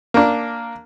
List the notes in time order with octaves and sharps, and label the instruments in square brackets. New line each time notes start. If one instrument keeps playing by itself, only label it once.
[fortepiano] A#3 D4